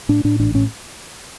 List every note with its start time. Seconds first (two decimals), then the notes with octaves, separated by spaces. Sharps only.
0.09 A2 D4
0.24 A2 D4
0.40 A1 D4
0.55 A2 C#4